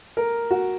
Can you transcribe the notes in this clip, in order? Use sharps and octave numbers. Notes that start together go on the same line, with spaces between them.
A#4
F#4